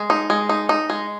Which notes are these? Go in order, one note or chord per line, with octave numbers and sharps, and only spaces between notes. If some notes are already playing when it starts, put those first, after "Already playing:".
Already playing: G#3
D#4
G#3
D#4
D#4
G#3